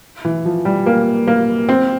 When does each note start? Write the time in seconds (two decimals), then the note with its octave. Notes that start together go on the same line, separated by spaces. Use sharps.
0.25 E3
0.45 F3
0.65 G3
0.86 A#3
1.27 A#3
1.69 C4